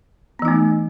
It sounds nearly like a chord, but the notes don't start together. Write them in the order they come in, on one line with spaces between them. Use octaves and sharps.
B3 E3 D#4 A3